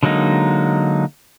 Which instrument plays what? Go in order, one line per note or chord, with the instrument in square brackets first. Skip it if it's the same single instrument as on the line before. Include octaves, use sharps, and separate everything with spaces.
[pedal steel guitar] D3 F#3 G#3 A#3 D#4